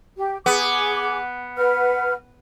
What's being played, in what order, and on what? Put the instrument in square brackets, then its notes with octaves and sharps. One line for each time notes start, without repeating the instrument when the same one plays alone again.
[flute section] G4
[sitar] B3 [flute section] G#4 D6
[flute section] B4 F#5 F6